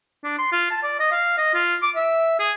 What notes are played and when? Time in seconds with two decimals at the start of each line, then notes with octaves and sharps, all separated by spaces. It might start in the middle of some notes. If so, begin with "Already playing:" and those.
0.24 D4
0.38 C6
0.52 F4
0.71 A5
0.83 D5
0.99 D#5
1.12 F5
1.38 D#5
1.54 F4
1.82 D6
1.96 E5
2.39 G#4